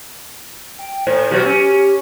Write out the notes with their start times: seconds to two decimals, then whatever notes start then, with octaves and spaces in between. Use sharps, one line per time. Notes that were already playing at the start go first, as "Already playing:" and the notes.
0.79 G5
1.07 A2 C5
1.31 B2 F#3 F#4 G4
1.46 C#4